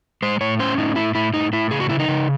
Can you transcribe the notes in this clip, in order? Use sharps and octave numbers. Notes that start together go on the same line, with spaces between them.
G#3 C5
A2 C#5
C#4 C5
A2 D#4
A2 E4
A2 E4
A2 D#4
A2 E4
C#3 G#4
F#4
C#3 E4
D#4
C#3